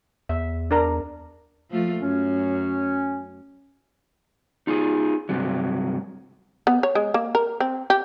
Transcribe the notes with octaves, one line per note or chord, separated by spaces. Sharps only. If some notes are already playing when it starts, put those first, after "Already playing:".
E2 E5
D4 A#4 A#5
F3 A3 F4
F#2 C#4
D#4 F4 G#4
G2 C3 F#3
B3
C#5
G#3
A#3
A#4
C4
G4